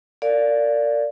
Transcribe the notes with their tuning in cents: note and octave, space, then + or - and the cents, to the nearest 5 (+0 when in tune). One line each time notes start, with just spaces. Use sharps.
A#4 -30 D5 -10 F5 +0